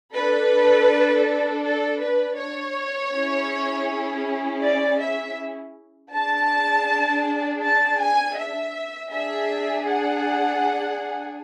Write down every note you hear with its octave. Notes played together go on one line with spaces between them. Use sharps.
D4 A4 B4
A4
B4
C#5
C#4 E4 G#4
D5
E5
D4 G#4 A5
A5
G#5
E5
D4 G#4 E5
F#5